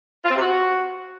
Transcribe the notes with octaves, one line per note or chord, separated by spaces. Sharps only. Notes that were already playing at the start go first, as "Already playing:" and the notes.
F4
C4
C3
F#4